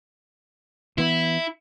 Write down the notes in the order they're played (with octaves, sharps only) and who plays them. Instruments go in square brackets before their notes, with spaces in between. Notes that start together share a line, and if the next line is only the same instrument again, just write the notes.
[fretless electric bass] E3 B3 [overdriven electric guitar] E4